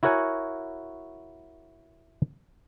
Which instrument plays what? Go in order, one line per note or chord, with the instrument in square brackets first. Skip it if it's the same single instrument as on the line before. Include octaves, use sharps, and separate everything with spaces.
[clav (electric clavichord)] E4 F#4 A#4 C#5 F#5 G#5